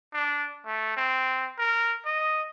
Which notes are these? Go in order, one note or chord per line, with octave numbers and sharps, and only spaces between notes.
D4
A3
C4
A#4
D#5